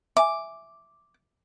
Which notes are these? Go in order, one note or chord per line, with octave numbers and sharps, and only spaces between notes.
E5 G#5 D6